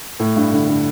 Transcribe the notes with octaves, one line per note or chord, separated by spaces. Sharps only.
A2
G2
D3
D3